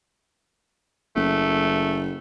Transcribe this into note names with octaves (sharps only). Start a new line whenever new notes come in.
F#1 A3